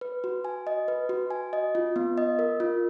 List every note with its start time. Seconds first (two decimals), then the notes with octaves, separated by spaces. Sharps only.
0.01 B4
0.24 F#4
0.45 G#5
0.67 D#5
0.88 B4
1.09 F#4
1.31 G#5
1.53 D#5
1.75 F4
1.96 B3
2.18 D#5
2.39 A#4
2.60 F4